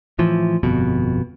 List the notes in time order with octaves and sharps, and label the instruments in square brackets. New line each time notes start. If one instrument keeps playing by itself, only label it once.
[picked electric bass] A2 E3 F3
G1 F2 B2